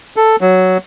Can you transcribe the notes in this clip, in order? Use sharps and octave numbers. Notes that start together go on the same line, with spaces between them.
A4
F#3